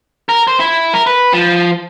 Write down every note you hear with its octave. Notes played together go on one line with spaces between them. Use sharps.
A#4
C5
E4
A#4
B4
F3